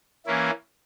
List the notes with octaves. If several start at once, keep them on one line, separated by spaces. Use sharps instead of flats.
E3 A#3 C#4 E4